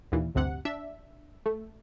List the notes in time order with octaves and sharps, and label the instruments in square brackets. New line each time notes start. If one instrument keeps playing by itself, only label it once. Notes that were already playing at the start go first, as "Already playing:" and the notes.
[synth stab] D#2 A#2 E3
A1 D2 G2 C3 F#5
D4 E5
A3